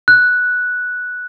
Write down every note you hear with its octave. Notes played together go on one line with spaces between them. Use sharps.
F#6